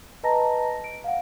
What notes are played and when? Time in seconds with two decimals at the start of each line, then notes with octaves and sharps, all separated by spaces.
0.23 B4 D#5 A5 A#5 A#6
0.84 D7
1.04 F5 F#5